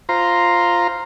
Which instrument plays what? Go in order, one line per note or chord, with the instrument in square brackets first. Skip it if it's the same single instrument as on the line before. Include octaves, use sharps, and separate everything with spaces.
[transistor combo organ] F4 C5 A#5